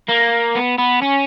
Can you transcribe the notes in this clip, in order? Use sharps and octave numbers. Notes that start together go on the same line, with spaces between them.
A#3
B3
B3
C#4